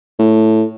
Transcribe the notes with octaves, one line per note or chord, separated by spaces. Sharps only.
A2